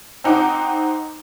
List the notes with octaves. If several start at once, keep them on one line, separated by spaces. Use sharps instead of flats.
C4 D#4 F#5 D6